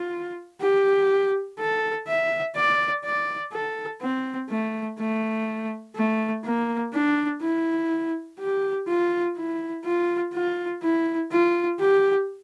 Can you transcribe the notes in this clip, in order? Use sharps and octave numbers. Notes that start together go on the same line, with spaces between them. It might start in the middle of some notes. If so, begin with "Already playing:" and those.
Already playing: F4
G4
A4
E5
D5
D5
A4
C4
A3
A3
A3
A#3
D4
E4
G4
F4
E4
F4
F4
E4
F4
G4